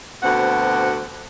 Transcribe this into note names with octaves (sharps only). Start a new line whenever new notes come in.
D2 B2 C4 F#5